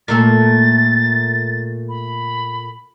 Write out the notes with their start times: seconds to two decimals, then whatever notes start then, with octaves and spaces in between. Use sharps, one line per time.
0.08 A#2 A3 A4 A6
1.89 B5